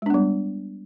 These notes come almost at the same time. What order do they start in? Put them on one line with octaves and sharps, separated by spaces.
G#3 D4 B3 G3